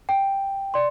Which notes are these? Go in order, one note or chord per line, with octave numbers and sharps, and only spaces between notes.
G5
D5 C6